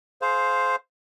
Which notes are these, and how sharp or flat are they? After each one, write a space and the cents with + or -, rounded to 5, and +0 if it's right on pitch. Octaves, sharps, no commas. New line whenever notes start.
G#4 +35 C5 +0 F5 +0